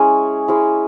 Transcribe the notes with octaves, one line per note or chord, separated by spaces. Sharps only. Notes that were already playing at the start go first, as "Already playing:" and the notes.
Already playing: G#3 C#4 E4 G#5
G#3 C#4 E4